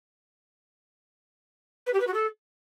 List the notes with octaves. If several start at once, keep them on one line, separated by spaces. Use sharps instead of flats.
B4
G4
B4
F#4
A4